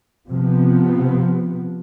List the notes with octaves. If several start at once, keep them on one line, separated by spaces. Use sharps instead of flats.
C3 F3 B3